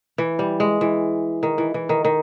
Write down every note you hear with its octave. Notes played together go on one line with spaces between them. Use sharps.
E3
G3
G#3
E3
D#3
E3
E3
D#3
D#3